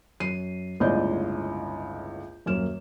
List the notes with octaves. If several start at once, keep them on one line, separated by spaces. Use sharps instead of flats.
F#2 C7 D#7
G1 C#2 A2 D5 D#5 G6
D#1 F#2 A#3 F6 E7